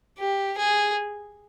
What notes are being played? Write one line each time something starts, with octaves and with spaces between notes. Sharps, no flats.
G4
G#4